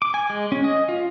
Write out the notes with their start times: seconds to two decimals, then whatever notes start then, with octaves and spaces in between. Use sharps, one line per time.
0.02 D6
0.14 G#5
0.30 G#3
0.52 C#4
0.64 D#5
0.89 F4